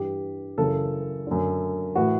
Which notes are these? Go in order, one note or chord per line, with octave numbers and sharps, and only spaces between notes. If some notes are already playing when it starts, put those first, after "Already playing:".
Already playing: G2 E3 G4
F#2 C#3 E3 A4
F#2 D3
A2 E3 F#4